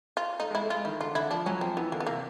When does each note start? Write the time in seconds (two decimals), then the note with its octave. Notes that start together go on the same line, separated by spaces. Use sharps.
0.17 F4
0.40 A3 D#4
0.51 G#3
0.55 E4
0.62 A3
0.70 G#3 F4
0.85 D#3 E4
1.01 D3 F4
1.15 D3 E4
1.31 F3 D4
1.46 F#3 C#4
1.61 F3 C4
1.77 E3 B3
1.92 D3 A#3
2.00 B3
2.07 C3 A#3